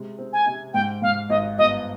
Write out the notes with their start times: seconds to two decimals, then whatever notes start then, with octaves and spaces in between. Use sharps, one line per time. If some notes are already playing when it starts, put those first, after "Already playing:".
Already playing: C3 G#3
0.18 C4
0.33 G#5
0.46 C3
0.74 G#2 G5
1.02 G#2 F5
1.29 G#1 D#5
1.58 G1 D#5